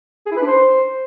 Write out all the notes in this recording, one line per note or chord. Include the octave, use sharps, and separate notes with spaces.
G#4
E4
B4
D4
C5